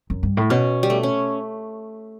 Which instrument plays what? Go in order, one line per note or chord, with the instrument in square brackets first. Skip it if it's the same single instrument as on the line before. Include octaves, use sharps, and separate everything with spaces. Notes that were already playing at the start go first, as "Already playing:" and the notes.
[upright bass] F#2
G2
A2
[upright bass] B2 [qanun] C#4
[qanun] G3
A3
C#4